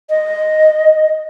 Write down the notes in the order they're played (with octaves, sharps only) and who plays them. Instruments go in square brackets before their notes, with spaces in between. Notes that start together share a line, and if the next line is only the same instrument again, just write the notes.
[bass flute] D#5